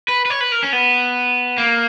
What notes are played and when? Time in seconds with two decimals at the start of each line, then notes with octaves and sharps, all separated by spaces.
0.08 B4
0.25 B4
0.30 C#5
0.41 B4
0.52 A#4
0.63 C#4
0.73 B3
1.58 A#3